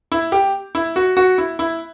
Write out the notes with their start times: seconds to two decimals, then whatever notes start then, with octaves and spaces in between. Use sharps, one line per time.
0.12 E4
0.32 G4
0.75 E4
0.96 F#4
1.17 F#4
1.38 E4
1.59 E4